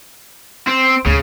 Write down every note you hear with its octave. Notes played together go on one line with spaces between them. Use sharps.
C4
D2 G#2 C#3